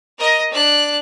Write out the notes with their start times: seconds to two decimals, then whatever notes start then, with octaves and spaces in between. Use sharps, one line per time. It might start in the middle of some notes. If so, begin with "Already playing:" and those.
0.18 A#4 D#5
0.51 D4 F#6